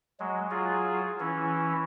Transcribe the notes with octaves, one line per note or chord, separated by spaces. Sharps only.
F#3 G#3
F#3 F4 G#4
E3 C#4 E4